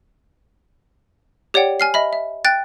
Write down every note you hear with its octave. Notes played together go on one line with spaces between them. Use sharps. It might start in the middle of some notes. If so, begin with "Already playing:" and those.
G4 C#5 D5 F#5 G5
G#5 F6 C7
D#5 E5 B5
E5
G5 F#6 A6